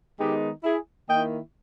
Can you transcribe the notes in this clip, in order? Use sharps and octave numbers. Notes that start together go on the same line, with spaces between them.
D#3 G#3 B3 D#4 G4
E4 G#4
D#3 A#3 E4 D#5 G5